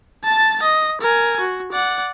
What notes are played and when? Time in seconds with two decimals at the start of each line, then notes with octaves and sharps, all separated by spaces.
0.24 A5 A6
0.62 D#5
1.01 A#4 G#5
1.40 F#4
1.72 D5 F#5